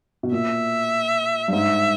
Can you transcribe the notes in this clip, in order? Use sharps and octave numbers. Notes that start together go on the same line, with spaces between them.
B2
A#2 E5
G2
G#2 E5